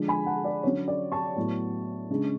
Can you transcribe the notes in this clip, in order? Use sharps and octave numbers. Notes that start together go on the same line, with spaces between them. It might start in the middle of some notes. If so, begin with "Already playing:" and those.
Already playing: D3 F3 G#3 D4
G#5 B5
F#5 A5
D5
D3 F#3 C#4 C#5
D5
A5 C#6
A2 F#3 B3
C#3 G#3 D4